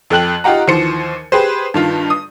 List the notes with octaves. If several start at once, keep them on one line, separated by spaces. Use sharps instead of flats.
F2 A4 G5 F#6 F#7
D#4 F4 G4 F#5 A#5
D#2 E3 F3 C5 C#7
G4 G#4 B4 C5
G2 D#3 F4
D#6